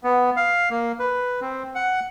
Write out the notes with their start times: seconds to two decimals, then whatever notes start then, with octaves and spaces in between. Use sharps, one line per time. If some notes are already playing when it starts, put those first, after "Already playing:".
0.04 B3
0.36 F5
0.70 A#3
0.99 B4
1.41 C4
1.75 F#5